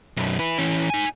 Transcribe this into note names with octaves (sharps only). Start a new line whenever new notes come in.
B1 F#2
E4 B4
E3 C#4
D#4 G#5